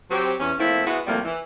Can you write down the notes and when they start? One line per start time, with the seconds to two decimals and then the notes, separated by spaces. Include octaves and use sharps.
0.11 F#3 C4 G4
0.39 E2 C#4
0.59 F3 A3 A#3 C4 E4
0.86 G#3 B3 E4 F#4 B4
1.07 A2 C3 F3 G3 A3 A#3
1.24 E3